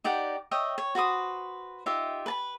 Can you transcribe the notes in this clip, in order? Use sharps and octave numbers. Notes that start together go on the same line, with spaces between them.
D#4 G4 D5 F#5
C#5 D#5 E5 G5
C#5
F#4 B4 C5 D#6
D#4 F4 G4 E5
B4 A5 B5